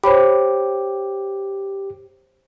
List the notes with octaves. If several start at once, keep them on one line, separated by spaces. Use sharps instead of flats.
G4 C5 C#5 B5